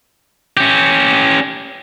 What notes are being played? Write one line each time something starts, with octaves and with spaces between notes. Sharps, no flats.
C#4 G4